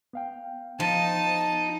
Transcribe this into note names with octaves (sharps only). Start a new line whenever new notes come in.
B3 F5 G5
F3 D#4 A5